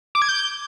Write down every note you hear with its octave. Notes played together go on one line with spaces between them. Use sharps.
D6
G#6
G6